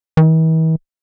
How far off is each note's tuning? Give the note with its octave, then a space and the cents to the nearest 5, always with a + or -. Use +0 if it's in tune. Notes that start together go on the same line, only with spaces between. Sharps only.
E3 -45